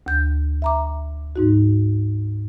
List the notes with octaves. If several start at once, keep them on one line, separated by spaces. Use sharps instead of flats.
D2 G6
E5 A#5 D6
G#2 D#4 F#4